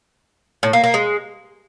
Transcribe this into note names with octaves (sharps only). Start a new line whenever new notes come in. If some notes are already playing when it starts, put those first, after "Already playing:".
A2
A#3
A#3
G#3